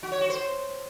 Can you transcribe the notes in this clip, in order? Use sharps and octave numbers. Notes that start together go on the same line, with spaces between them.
F#4
C#5
F#4
C5